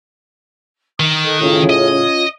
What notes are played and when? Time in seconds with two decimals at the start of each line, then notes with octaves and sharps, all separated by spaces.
1.00 D#3 D#6
1.23 A4 D#5 F#6
1.41 A2 C#3 C#4 F4 C#5
1.69 D#5